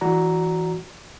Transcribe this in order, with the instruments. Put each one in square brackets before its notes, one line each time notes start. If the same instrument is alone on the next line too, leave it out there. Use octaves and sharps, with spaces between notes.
[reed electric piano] E3 F#4 D5 A#5